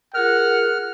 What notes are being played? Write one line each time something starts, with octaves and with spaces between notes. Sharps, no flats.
F4 G#4 A#4 F#5 F6